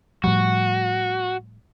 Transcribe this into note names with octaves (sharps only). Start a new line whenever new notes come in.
A2 F3 G3 F#4